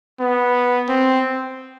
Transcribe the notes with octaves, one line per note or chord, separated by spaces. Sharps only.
B3
C4